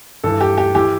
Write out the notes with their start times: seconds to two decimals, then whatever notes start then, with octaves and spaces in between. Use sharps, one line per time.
0.24 G2 E3 A4
0.41 G4
0.58 G4
0.75 E3 G4